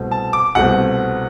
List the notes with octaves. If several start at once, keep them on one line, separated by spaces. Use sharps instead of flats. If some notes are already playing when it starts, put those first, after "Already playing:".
Already playing: C2 B2 A3 C4
A5
D6
C2 B2 A3 C4 F#5